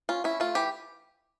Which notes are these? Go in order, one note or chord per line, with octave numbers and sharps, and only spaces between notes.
C#4 F4
C#4 E4
A3 F4
E3 G4